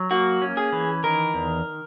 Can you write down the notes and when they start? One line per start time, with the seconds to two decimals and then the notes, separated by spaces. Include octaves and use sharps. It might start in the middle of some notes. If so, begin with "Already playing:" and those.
Already playing: F#3
0.11 A#3 F#4
0.42 C#4
0.57 G#4
0.72 E3
1.04 D#3 A#4
1.34 E2